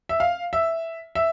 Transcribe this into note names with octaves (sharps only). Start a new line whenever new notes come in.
E5
F5
E5
E5